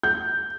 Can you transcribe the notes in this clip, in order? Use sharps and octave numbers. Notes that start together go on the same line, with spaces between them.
G6